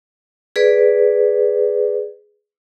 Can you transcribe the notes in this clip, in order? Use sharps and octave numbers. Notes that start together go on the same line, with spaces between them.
G#4 B4 D5